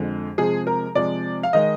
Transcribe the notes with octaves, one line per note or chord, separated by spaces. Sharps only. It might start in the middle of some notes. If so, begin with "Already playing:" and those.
Already playing: F2 D3 G#3
C3 F3 G#3 G#4
A#4
C3 F3 G#3 D5
F5
D#3 G#3 D#5